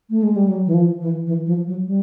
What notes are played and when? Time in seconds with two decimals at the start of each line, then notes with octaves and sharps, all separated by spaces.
0.10 A3
0.23 G#3
0.36 G3
0.48 F#3
0.66 E3
0.74 F3
1.01 E3
1.26 E3
1.46 F3
1.67 F#3
1.87 G3